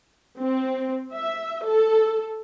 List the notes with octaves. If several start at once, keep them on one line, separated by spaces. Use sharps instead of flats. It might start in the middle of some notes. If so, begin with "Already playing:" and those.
C4
E5
A4